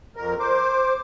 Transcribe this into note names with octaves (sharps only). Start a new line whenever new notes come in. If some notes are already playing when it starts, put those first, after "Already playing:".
F2 A#4
C5 D6